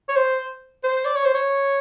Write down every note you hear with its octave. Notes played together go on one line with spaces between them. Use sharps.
C#5
C5
C5
D5
C#5
C5
C#5